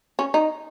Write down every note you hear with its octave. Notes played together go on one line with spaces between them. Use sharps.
C#4
D#4